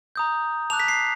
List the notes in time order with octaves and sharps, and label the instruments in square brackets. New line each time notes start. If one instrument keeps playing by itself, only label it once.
[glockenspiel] A#5 D#6 G6
A5 D6 F#6 F7
B6
C7